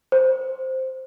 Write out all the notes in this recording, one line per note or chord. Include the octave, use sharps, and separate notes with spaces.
C5